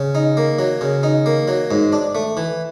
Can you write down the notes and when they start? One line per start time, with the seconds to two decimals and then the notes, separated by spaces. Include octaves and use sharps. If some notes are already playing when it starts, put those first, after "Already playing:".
Already playing: C#3
0.15 D#4
0.37 A#3
0.59 F#3
0.81 C#3
1.03 D#4
1.26 A#3
1.48 F#3
1.71 G#2
1.92 D4
2.15 A3
2.37 E3